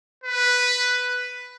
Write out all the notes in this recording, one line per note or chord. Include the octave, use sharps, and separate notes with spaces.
B4